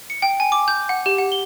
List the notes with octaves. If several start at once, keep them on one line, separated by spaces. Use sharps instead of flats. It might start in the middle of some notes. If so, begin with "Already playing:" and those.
C#7
G5
G#5
D6
G6
F#5
G4
F#5
G7